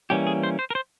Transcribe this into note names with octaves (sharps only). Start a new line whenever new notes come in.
E3 G3 A#3 C#4 G4
G#4
C5
C5
A#4
C5